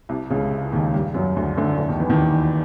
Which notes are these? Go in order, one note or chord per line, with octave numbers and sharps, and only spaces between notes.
C2 C3
C#2 C#3
D#2 D#3
G2 G3
F#2 F#3
D2 D3
D2 D3
D2 D3
D#2 D#3
E2 E3
D#2 D#3